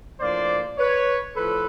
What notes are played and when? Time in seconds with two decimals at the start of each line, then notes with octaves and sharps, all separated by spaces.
0.20 A2 F3 A#3 D4 C5 D5
0.78 B4 C#5
1.36 A2 F3 A4 B4